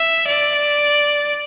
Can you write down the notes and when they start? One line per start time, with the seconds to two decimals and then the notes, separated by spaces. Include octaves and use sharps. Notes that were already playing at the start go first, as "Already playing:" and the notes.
Already playing: E5
0.27 D5